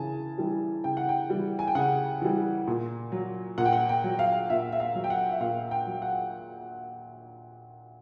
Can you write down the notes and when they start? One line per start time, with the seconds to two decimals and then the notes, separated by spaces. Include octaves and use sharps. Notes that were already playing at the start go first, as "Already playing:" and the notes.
Already playing: C#3 E3 G#5 A5
0.38 E3 G3
0.84 C#3 G5
0.97 F#5
1.09 G5
1.30 E3 G3
1.59 G#5
1.68 G5
1.75 C#3 F#5
2.22 E3 G3
2.67 A#2
3.12 F#3
3.58 A#2 F#5
3.65 G5
3.73 F#5
3.89 G5
4.04 F#3
4.19 F5
4.50 A#2 E5
4.72 E5
4.80 F5
4.95 F#3
5.04 G5
5.10 F#5
5.31 E5
5.40 A#2 F5
5.71 G5
5.87 F#3
6.02 F#5